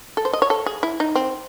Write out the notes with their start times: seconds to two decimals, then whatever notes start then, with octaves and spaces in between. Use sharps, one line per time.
0.17 A4
0.25 C5
0.33 D#5
0.42 C#5
0.50 A4
0.66 G#4
0.83 E4
1.00 D#4
1.15 C4